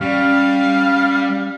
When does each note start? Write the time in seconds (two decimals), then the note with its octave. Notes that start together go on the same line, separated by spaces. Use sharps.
0.01 G3 C#4 D5 F5